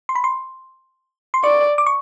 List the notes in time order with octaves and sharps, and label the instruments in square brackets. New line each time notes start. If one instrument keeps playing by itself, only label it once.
[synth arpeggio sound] C6
B5
C6
C6
[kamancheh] D5 [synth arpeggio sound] C#6
[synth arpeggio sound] D6
C#6